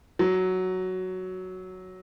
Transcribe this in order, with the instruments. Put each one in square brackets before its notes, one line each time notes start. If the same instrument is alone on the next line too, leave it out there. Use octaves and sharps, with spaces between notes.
[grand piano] F#3